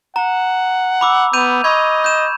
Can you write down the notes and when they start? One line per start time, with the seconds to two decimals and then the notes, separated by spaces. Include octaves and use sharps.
0.16 F#5 A#5
1.01 B5 D6 E6
1.33 B3 G6 D#7 F7
1.64 D#5 B5 C#6 G#6
2.04 G6 E7